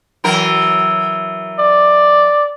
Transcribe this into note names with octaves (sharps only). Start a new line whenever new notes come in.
E3 F#3 A#4
D5